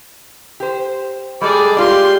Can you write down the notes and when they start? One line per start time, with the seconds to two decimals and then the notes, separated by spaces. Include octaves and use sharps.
0.60 G4 C5
1.41 G3 G#3 G#4 A4 D5
1.77 G#3 F4 G4 D5 C6